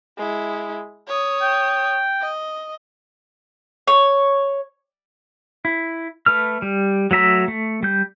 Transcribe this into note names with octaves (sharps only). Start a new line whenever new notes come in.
G#3 E4
C#5 D#6
G5
D#5
C#5
E4
A3 B4 F6
G3
F#3 A3 E5 A#5
A3
G3 G6